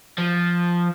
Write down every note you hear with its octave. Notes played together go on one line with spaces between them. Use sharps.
F3